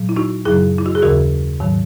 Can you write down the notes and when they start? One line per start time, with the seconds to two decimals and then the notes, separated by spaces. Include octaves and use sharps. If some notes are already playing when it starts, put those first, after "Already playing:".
Already playing: A#2 F#3
0.09 E4
0.16 D#4 F#4
0.45 F#2 C#3 F#3 E4 G#4
0.79 E4
0.86 F#4
0.95 G#4
1.02 D#2 C#3 E3 F#4 A#4
1.60 G#2 D#3 F#3